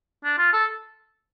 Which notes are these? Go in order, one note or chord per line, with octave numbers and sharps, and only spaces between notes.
D4
F4
A4